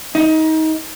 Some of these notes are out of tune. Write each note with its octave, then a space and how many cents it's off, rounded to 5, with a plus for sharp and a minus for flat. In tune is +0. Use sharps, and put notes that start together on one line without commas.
D#4 +25